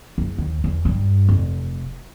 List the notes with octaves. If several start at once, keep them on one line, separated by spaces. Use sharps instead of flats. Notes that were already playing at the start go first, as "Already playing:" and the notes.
F#1
D#2
E2
G2
F1